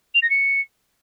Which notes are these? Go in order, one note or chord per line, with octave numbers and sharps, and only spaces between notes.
F7
A#6
C#7